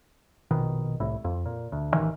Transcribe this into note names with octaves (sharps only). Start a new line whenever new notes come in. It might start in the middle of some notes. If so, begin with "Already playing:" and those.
A#1 B2 D#3
C2 A2
F2
A#2
D2
A1 D#3 E3